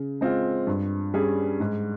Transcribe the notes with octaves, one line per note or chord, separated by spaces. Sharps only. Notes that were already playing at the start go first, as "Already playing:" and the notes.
Already playing: C#3
G#3 C4 F4
G2
G3 C#4 G#4
G#2